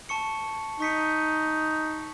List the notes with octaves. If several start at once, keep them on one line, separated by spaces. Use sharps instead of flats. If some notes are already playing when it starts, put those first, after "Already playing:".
A5 C#6 C#7
D#4 C#6 B6 C#7